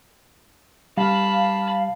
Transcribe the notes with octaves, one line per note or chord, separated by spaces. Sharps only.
G3 F5 A5 B5